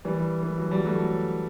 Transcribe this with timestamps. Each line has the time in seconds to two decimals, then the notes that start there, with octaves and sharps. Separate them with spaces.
0.05 E3 G3
0.43 E3
0.58 F#3
0.71 G3
0.85 F#3 A3